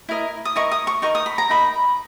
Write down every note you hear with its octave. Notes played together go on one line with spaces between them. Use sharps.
E4 A#4 D#5
D#6
E4 A#4 D#5 C#6
D#6
C#6
D#4 A#4 D#5 C#6
D#6
B5
A#5
D#4 A#4 D#5 B5